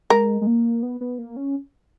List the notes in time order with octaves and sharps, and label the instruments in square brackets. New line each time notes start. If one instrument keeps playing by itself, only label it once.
[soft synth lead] G#3 [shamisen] A#4
[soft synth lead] G#3
A#3
B3
B3
A#3
C#4